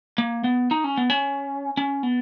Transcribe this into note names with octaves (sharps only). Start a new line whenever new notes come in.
A#3
B3
D#4
C#4
B3
C#4
C#4
B3